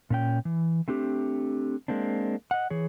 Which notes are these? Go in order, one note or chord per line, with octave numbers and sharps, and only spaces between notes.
A#2 C#4 G5
E3
A3 C4 D4 G4
G#3 A#3 C4 D4
D#5 F#5
E3 G#4 C#5